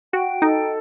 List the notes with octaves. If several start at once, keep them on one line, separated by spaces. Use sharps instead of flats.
F#4 G5
D#4 A4